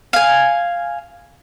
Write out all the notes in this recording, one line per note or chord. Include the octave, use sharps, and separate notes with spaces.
F5 G#5